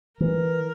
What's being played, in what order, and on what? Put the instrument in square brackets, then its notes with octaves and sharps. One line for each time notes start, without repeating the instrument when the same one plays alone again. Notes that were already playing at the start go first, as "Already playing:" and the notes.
[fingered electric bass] E3 [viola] A#4